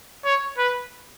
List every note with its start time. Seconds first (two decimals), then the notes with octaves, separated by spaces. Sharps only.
0.25 C#5
0.58 B4